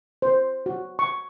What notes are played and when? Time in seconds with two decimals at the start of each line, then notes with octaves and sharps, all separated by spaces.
0.22 C5
0.66 F#4
0.99 C#6